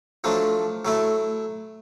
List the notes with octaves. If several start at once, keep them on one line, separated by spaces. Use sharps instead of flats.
F3 F#3 A3 D4
F#3 A3 E4